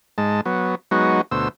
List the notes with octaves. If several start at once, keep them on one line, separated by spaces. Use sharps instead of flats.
G#2 G#3 A5
F#3 B3
F#3 G#3 B3 D#4 F#4
D2 B2 C5 E6